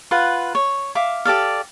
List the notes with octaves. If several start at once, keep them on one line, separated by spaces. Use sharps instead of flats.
F4 B4 F#5
C#5
E5 F5 D6
G4 A4 D5 F5